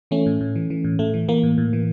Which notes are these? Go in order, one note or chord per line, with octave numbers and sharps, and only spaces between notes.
E3 A3 C#4
A2
A2
E3
E3
A2
A2 A3
E3
E3 A#3
A2
A2
E3